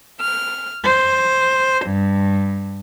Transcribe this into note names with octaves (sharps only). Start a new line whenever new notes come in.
F6
C5
G2